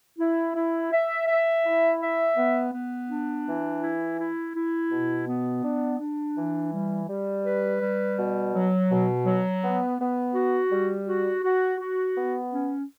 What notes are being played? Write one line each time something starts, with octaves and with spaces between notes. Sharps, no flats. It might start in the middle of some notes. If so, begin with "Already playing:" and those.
E4
E4
E5
E5
E4
E5
B3
B3
D4
E3
E4
E4
E4
B2
B3
D4
D4
E3
G3
G3
B4
G3
B2
F#3
B2
F#3
B3
B3
F#4
G3
F#4
F#4
F#4
B3
C#4